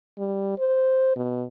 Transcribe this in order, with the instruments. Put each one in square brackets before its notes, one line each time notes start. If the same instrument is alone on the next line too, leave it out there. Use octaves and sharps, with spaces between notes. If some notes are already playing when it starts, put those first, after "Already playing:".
[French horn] G3
C5
B2